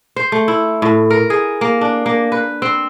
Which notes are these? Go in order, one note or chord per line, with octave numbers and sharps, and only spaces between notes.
C5
A3
E4
A2
A#4
G#4
A#3
D4
A#3
B4
C4